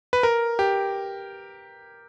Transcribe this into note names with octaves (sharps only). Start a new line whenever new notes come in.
B4
A#4
G4